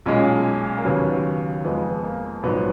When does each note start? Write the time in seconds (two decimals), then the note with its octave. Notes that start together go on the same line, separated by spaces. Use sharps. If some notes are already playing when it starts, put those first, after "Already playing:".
0.06 B1 A#2 G#3 C#4
0.78 A#3
0.85 D#2 C#3 F#3 B3
1.65 F2 F3 G#3 B3
2.04 A#3
2.43 A#1 G#2 F#3 B3